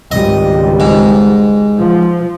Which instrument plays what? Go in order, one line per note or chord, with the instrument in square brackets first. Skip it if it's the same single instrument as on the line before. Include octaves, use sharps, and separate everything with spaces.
[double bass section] G#1 C#2 G3 [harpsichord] D#5
[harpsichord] G#2
[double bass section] F3